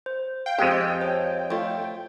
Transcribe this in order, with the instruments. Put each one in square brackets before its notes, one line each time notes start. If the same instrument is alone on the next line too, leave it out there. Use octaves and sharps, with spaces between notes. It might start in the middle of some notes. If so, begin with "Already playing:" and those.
[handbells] C5
[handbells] F5 [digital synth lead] G5
[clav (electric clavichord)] F2 G#3 [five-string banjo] C4 G4
[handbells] C5 C#5
[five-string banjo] A3 F4